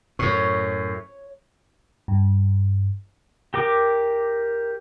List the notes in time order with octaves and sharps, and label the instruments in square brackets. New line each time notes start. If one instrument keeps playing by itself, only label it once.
[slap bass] F#2 A2 [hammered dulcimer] C#5
[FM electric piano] G2
[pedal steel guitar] G4 A#4 D6